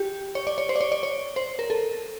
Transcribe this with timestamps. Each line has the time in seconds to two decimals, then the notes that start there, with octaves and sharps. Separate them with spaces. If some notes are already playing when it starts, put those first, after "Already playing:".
Already playing: G4
0.35 C#5
0.47 D5
0.58 C#5
0.69 C5
0.76 D5
0.81 C#5
0.92 D5
1.03 C#5
1.36 C5
1.59 A#4
1.70 A4